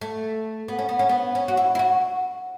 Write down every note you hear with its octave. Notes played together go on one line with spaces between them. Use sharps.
A3
B3
C#4
B3
C#4
B3
C#4
F#4
E4
E4
F#4